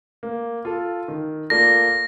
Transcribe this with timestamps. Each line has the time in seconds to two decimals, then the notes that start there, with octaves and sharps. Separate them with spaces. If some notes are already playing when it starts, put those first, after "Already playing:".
0.23 A#3
0.65 F4 A4
1.08 D#3
1.50 A#3 F4 A4 D5 A#6